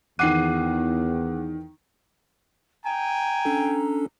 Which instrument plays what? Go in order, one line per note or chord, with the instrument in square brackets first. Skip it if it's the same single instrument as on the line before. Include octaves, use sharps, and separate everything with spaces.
[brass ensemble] E2 [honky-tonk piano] D#3 C7 D#7 [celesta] F#5 D6 F#6
[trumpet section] G5 G#5 [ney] A#5
[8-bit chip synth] C#4 D4 A4